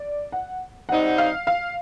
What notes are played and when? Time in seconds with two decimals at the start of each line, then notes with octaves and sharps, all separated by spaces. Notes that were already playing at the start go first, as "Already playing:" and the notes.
Already playing: D5
0.32 F#5
0.89 G3 C4 D#4 F#5
1.18 F5
1.47 F5